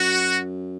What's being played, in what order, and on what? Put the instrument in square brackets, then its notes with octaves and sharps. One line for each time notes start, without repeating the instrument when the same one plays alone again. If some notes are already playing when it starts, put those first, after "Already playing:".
Already playing: [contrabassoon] F#2 [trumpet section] F#4